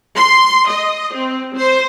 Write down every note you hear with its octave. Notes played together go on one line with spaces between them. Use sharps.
C6
D#5
C4
C5